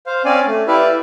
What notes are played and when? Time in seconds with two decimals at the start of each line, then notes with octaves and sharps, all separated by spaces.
0.07 C5 F5
0.25 C4 C#4 D5 F5 G#5
0.47 A3
0.67 E4 G4 B4 D5 E5 F5